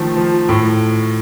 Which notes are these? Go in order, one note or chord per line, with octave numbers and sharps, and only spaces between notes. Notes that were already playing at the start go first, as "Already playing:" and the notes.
Already playing: D#3 F3 A3
F3
A2